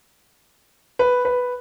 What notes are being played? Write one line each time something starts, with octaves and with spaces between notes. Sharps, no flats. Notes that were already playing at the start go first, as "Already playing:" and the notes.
B4
B4